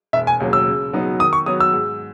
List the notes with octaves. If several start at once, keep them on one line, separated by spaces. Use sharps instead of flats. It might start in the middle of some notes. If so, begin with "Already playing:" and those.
E1 E5
G#5
D#2 C#3 F#3
E6
C#3
F#3 B3 D#4
D#3 D#6
C#6
F#3 B3 F#4 C#5 D#6
E6
G#2